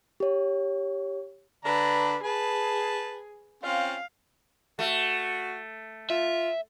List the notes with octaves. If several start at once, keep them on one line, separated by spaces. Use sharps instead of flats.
G4 C#5
D3 D4 B4 A#5
G#4 B4 A5
C4 C#4 F4 F5
A3 F#4
F4 E5